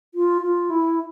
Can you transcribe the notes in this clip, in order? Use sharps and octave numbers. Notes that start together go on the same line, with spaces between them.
F4
F4
E4